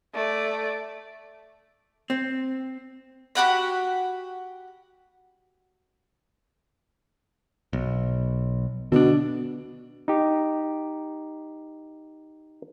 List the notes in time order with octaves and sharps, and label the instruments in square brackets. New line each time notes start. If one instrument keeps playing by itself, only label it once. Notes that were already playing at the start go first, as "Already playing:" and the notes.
[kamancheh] A3 D5
[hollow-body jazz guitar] C4
[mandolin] F#4 G4 F#5 B5
[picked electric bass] B1
[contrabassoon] B2 [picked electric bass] D3 D4
[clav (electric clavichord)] D#4 G4